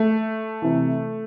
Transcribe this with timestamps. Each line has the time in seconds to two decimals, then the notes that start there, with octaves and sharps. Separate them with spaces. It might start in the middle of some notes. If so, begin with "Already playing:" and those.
Already playing: A3
0.62 C3 E3